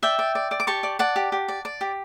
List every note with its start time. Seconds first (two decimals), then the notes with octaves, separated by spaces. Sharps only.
0.03 D5 E5 G5
0.19 D5
0.35 D5
0.51 D5
0.60 D6
0.67 G4 A5 C#6
0.83 D5
0.99 D5 F#5 A5
1.16 G4
1.32 G4
1.48 D5
1.65 D5
1.81 G4